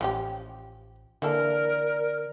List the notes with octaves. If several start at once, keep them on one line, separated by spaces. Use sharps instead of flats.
A1 F3 C#4 G4
D3 E3 A#3 A4 A#4 D5